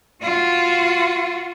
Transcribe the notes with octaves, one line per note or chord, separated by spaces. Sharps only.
F4 F#4